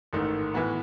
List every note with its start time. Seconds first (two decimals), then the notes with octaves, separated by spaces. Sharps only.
0.13 A1 G#2 D#3 A3
0.54 A2 E3 B3 F#4